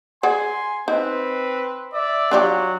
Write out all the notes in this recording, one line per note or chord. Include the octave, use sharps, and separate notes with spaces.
G#4 D5 F#5 G#5 C6
C4 D#4 B4
D5 E5
F#3 D4 F4 G4